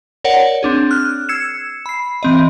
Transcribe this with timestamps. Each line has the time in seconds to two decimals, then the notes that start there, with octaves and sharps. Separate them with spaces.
0.24 A#4 C#5 D5 F#5
0.63 C4 D4 G#4
0.91 F6 F#6
1.29 E6 G#6 C7 C#7 E7
1.86 B5 C7
2.23 E3 C4 D#5